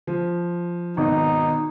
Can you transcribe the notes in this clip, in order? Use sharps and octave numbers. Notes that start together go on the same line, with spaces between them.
F3
G#1 B2 D#4